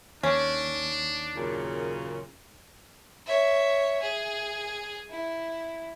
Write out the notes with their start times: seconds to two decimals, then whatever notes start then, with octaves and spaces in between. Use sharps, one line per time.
0.23 D#2 C#4 D4
1.36 F#2 A#2 C#3
3.26 C#5 E5
4.02 G#4
5.10 E4